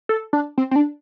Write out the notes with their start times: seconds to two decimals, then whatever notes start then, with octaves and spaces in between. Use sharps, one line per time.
0.09 A4
0.33 D4
0.58 C4
0.71 C4
0.76 D4